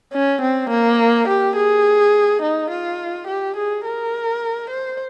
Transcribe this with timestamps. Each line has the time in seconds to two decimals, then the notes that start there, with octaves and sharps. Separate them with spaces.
0.13 C#4
0.41 C4
0.70 A#3
1.28 G4
1.56 G#4
2.42 D#4
2.71 F4
3.27 G4
3.57 G#4
3.85 A#4
4.70 C5